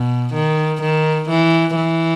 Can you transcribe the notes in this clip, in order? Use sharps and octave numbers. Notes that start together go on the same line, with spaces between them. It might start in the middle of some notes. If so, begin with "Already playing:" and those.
Already playing: B2
D#3
D#3
E3
E3